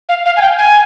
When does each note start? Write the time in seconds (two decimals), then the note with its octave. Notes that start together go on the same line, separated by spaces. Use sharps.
0.09 F5
0.26 F5
0.37 G#5
0.41 G5
0.58 G#5